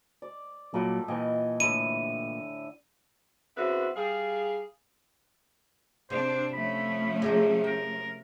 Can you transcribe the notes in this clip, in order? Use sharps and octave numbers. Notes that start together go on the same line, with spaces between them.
D5
A#2 F#3 G3 F4 A4
A#2 E3 D#5 G5 G#5
A2 D3 E4 D#7
C#3 B3 C4 E4 F#4 B4
G3 G#4 F5
C3 C4 D4 C5
F3 A3 C#4 B5
G#3 G4 A#4
A#4 G5